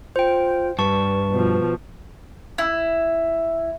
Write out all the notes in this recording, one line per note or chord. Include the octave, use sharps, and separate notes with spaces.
F4 C5 G5
G2 B4 A5 C#6
B2 F3
E4